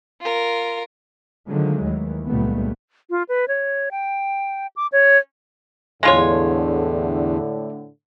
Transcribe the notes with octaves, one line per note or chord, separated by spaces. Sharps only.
F4 A#4
D3 D#3 F3 F#3 G#3 A3
D#2 D#3 E3
C#2 G2 A#2 G3 A3 B3
F4
B4
C#5
G5
D6
C#5
E2 A2 D3 G#3 F4 C#5